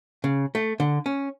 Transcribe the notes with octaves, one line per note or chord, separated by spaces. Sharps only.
C#3
A3
D3
C#4